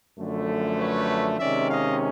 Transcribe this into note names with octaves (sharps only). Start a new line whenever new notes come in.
F#2 D3 F3 A3
B4 C#5
C3 D#3 G#3 C#4 D5 E5
D#5 F5